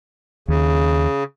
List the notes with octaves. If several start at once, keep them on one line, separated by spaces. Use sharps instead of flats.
D#2 C#3